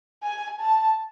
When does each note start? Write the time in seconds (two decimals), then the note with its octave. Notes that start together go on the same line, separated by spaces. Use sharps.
0.23 G#5
0.60 A5